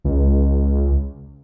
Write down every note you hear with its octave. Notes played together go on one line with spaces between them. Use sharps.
C#2